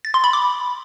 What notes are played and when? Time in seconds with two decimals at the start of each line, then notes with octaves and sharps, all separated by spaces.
0.05 A6
0.14 C6
0.24 B5
0.33 D6